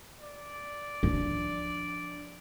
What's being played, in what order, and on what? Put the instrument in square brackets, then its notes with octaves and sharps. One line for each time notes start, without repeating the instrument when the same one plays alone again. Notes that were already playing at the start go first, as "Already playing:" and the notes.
[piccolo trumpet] D5
[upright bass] F3 D4